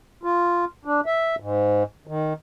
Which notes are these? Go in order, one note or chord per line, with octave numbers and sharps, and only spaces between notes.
F4
D4
E5
G#2
D#3